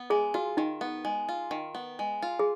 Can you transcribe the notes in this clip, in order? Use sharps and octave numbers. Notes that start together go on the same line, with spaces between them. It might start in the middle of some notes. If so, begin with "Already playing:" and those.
Already playing: B3
G#3 G#4
F4 F#4
D#3 D#4
B3
G#3
F4
D#3
B3
G#3
F4
G#4